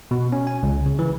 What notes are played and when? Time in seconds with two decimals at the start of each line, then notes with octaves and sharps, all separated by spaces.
0.11 B2
0.32 C#4
0.47 G#5
0.63 C#2
0.86 C#3
0.99 E3